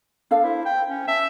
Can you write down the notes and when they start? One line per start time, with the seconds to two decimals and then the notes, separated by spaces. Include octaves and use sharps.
0.31 D4 A4 F5
0.44 E4 C5
0.65 G5
0.88 C#4
1.07 E5 A5